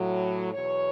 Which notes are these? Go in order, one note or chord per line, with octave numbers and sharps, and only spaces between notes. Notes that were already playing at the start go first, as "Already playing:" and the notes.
Already playing: A2 F#3
E2 B2 F#3 C#5